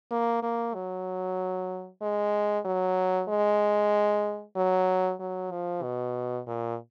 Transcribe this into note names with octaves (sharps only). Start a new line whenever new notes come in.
A#3
A#3
F#3
G#3
F#3
G#3
F#3
F#3
F3
B2
A#2